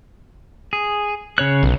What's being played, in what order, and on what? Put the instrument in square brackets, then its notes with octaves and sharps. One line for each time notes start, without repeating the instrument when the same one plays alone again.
[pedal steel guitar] G#4
C#3 C#5 F#6
[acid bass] B1